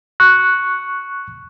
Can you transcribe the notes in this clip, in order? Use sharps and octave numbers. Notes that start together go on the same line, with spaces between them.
C#6 F#6